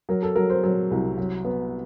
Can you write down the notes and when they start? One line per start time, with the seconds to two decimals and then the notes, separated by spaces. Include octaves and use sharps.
0.09 F#3 A#4
0.23 A4
0.36 F#3 A#4
0.50 C5
0.64 F#3
0.91 C2
1.18 F#3
1.45 B3